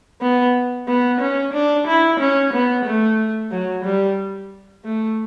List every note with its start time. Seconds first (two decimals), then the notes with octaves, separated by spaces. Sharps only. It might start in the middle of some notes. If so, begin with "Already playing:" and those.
0.21 B3
0.88 B3
1.21 C#4
1.53 D4
1.87 E4
2.20 C#4
2.53 B3
2.85 A3
3.52 F#3
3.85 G3
4.85 A3